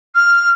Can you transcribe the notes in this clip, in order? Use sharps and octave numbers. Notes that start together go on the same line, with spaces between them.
F6